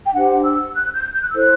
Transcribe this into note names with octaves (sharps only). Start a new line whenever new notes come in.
G5
D4 G4 C5 F#5
E6
F#6
G6
G6
F#6
E6
E4 A4 C5 F#6